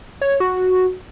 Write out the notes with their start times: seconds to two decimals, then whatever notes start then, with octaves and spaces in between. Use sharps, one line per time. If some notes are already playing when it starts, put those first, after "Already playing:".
0.21 C#5
0.40 F#4